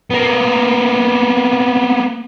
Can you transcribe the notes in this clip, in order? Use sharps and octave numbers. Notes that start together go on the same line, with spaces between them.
A#3 B3